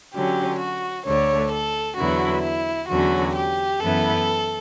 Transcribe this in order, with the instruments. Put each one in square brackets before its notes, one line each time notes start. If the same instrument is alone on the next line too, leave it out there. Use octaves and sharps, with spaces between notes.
[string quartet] D3 F#3 C#4 [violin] G4
[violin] F#4
[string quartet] D2 D3 A3 [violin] C#5
[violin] A4
[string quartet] E2 D3 F#3 B3 E4 [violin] F#4
[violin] E4
[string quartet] E2 D3 F#3 C#4 [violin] F#4
[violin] G4
[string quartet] F#2 E3 B3 E4 B4 [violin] A4